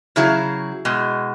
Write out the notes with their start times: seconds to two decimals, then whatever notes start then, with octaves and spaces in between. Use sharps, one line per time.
0.16 C#3 F#3 E4 G#4
0.85 B2 G#3